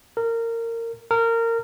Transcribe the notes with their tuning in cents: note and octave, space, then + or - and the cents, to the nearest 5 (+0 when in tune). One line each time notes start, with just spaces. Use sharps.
A#4 -20
A#4 -20